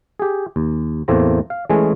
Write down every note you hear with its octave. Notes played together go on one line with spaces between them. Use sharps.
G4 G#4
D#2
E2 A2 A3 A#3 C4 A#5
F5
E3 G#3 A3 C#4 G#4